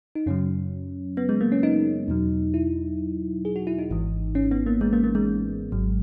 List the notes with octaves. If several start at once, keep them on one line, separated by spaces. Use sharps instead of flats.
D#4
F#2 C#3 F#3 C#4
B3
G#3
A#3
C#4
D#4
E2 B2 F#3
E4
G#4
F#4
E4
D#4
G#1 G#2 E3
C#4
B3
A#3
G#3
A#3
A#3
G#3
G#1 G#2 F#3